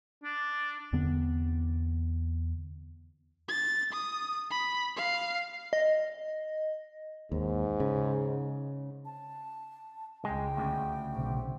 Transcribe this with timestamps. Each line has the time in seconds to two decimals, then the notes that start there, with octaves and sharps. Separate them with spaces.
0.24 D4
0.93 E2 D3 B3 C4
3.49 A6
3.93 D#6
4.50 B5
4.97 F5
5.73 D#5
7.32 D#2 G#2
7.80 C#3
9.05 A5
10.25 C#2 G#3 G5
10.57 D2 A2 C#3
11.14 B1 C3